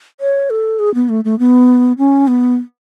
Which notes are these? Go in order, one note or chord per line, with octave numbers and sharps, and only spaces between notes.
C#5
A4
G#4
B3
A3
A3
B3
C#4
B3